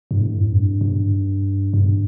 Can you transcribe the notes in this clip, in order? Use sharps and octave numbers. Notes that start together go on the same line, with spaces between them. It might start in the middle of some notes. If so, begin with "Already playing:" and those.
G2
A2
F2
G2
G2
G2